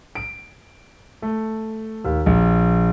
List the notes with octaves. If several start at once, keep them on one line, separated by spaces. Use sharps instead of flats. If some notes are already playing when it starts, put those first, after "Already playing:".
D7
A3
D#2
A#1